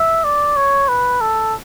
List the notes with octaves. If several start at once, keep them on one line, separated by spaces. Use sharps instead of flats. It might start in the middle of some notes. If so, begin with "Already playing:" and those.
Already playing: E5
D5
C#5
B4
A4